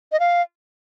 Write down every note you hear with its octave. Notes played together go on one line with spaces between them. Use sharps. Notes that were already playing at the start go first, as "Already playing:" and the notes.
D#5
F5